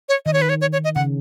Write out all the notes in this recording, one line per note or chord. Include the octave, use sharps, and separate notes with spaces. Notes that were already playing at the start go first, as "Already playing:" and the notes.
C#5
D#3 D#5
C#5
B4
C#5
C#5
C#5
D#5
C#3 F#5